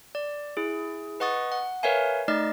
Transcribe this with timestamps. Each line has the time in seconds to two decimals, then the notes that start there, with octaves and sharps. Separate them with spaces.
0.15 D5
0.57 E4 G#4
1.20 B4 D#5 F#5 C#6 D#6 A6
1.52 F#5
1.83 A#4 B4 C#5 E5 F5 G#5
2.28 A3 D#4 D5 D#5 A6